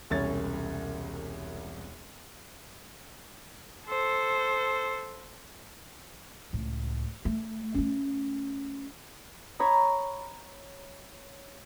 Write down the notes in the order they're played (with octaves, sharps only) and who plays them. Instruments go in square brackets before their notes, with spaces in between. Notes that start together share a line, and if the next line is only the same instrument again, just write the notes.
[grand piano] E1 C2 C#4 C#5 A6
[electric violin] A4 C5
[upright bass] C#2 A2
A3
A3 C#4
[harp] C#5 A#5 B5 D#6